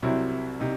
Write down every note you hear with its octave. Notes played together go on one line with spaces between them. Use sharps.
C2 C3 F#3 C4 E4
C3 D#4